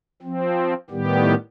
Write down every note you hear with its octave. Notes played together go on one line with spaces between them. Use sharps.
F3 C4
A2 D#3 G3 B3 G4